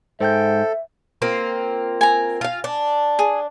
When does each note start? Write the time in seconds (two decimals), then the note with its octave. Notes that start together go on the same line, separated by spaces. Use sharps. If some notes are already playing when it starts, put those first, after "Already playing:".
0.20 G#2 A4 C5 E5 G5 G6
1.22 A#3 C4 F4
2.01 G#5 A#5
2.41 F4 F5
2.64 D4
3.19 G#4